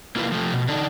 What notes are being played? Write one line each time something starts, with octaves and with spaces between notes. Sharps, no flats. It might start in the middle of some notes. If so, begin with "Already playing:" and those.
A#3 E4 F4 B4
F3 A3
B2
D3 D4 D#4